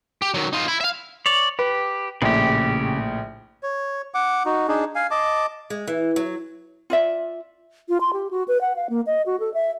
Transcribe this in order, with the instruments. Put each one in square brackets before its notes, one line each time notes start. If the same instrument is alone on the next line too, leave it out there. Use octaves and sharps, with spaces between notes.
[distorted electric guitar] G4
D#3 F#3
D#4 F4
E4
E5 F5
[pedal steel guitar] C#5 D5
[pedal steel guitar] G4 [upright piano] B4
[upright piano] A#1 A2 [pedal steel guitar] C#3 G4
[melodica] C#5
F#5 D6
D#4 F#4
D4 D#4 G#4
F5 G#5
D#5 A5 D6
[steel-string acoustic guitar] G#3
E3
F#3
[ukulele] F4 D5 E5
[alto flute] F4
C6
G4
F#4
B4
F#5
F5
A#3
D#5
F#4
A4
E5